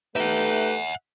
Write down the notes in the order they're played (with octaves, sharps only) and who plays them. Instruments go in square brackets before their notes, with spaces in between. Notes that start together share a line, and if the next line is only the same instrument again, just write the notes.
[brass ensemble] A3 [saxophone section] D#4 G4 B4 [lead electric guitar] E5 F#5